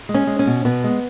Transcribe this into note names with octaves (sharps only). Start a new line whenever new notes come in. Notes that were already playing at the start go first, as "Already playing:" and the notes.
G#3
C#4
G#3
C#4
B2
B2 B3
G#3